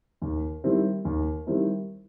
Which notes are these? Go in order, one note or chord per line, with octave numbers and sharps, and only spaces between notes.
D#2
D#3 G3 C4 E4
D#2
D#3 G3 C4 E4